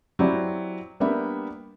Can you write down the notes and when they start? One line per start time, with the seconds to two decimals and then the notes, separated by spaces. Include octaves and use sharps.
0.19 F#3 C4 E4 F#4 G4 D5
1.00 G3 A#3 B3 D4 G4 E5